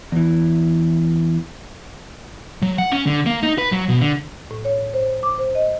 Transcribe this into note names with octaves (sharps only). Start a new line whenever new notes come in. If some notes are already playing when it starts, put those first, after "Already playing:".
E2 E3
F#3
F#5
C#4
D3
A#3
D#4
B4
F#3
B2
D3
A2
C#5
C5
D6
C5
D#5